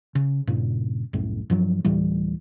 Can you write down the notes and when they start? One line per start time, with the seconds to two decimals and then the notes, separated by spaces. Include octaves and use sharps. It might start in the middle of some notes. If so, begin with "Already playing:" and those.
0.15 C#3
0.47 G2 A#2 C#3
1.13 C2 F#2 A2
1.50 G2 F3 F#3
1.85 D2 A2 E3 G3